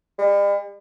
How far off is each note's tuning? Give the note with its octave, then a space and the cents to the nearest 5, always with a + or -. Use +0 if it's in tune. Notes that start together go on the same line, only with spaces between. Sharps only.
G3 +45